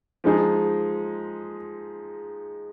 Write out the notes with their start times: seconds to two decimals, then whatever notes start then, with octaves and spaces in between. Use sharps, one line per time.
0.24 F3 G#3 D#4 G#4